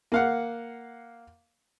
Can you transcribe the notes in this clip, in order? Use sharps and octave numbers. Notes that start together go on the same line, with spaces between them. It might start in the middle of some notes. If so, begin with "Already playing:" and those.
A#3 F5 F#5